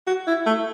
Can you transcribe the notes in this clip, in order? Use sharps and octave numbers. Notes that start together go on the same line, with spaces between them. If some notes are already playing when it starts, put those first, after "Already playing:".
F#4
E4
A3